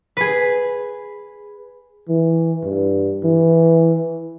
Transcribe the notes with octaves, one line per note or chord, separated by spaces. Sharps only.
G#4 B4
E3
G2
E3